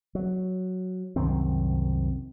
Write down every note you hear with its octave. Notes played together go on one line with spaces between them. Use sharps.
F#3
C2 F#2 D#3 C4